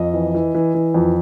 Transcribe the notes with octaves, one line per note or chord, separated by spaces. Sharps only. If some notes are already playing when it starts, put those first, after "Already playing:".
Already playing: F2 D#5
E3
E3
E3
E3
F2